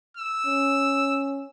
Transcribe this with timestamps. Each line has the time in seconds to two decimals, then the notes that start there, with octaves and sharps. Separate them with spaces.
0.17 E6
0.46 C#4